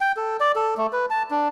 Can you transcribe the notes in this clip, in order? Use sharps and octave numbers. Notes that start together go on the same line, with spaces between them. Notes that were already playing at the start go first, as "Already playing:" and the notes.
G5
A4
D5
A4
A3
B4
A5
D4